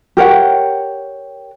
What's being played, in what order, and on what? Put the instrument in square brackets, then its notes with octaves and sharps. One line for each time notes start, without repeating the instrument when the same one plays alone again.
[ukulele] G4 A#4 C#5 F#5